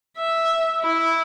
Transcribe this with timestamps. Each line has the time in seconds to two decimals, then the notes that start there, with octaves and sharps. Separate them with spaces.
0.18 E5
0.80 E4